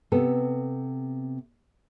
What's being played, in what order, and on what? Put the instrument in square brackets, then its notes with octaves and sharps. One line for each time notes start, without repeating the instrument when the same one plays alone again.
[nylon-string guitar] C3 B3 A4